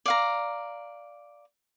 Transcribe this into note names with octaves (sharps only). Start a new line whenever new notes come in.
D5 F5 A#5